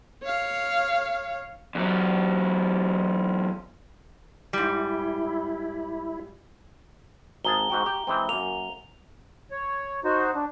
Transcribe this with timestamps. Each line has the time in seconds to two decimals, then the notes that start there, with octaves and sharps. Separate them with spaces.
0.23 C#5 F5
1.75 E2 F#3
4.53 G#2 G3 E4
7.45 G#1 G#4 A5 A#5 G7
7.70 G#2 F#4 G5
7.86 G4
8.07 E3 G#3 C4
8.29 F#2 A#3 F7
9.51 C#5
10.04 D#4 F#4 C5
10.35 D4